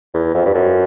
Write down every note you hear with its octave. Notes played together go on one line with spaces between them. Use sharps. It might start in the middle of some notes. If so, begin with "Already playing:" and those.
E2
F2
G2
F#2